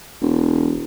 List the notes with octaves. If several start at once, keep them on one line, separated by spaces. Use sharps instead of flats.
E1